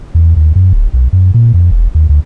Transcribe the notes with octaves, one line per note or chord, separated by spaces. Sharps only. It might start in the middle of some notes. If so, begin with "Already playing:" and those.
E2
D#2
F#2
D1
B1
F#2
A#2
F2
E1
D#2
D2